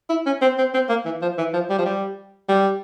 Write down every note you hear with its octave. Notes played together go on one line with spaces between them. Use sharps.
E4
C#4
C4
C4
C4
A#3
E3
F3
E3
F3
G3
F3
G3
G3